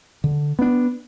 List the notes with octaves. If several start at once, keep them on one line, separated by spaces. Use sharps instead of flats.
D3
B3 D4